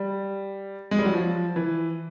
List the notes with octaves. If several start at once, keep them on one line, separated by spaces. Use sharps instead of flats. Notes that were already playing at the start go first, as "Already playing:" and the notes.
Already playing: G3
G#3
G3
F#3
F3
E3